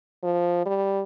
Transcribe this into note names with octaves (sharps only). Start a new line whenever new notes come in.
F3
G3